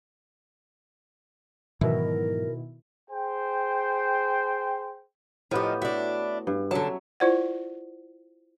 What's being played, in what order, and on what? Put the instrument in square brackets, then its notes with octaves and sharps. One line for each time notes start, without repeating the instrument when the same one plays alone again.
[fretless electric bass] G#2 E3 F#3 [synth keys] B2 D#3 E4 [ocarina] A#4
[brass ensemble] G#4 C5 G5
[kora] A2 B3 G4 [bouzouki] F3 D#4
[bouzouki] D4 E4 [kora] F#4
[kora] G2
[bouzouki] D3 A5 [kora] F#3 C#4 E5
[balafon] E4 F4 C5 D5 F#5